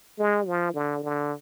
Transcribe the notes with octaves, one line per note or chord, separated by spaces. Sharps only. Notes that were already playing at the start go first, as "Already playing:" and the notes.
G#3
F3
D3
D3